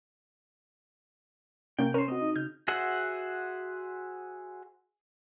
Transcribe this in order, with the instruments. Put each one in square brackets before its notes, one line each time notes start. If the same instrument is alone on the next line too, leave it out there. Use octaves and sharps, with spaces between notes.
[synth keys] C3 [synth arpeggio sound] A#3 C#4 [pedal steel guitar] G5
[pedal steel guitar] C#4 C5 [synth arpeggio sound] A#4
[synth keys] C4 F#4 [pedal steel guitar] D#5
[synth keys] D#4
[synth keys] C#3 [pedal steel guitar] F6 [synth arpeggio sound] G6
[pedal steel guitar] F#4 G#4 C5 E5 F#5